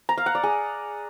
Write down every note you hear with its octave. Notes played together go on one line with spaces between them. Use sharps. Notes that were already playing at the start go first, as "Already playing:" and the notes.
A#5
F5
F#5
D5
G#4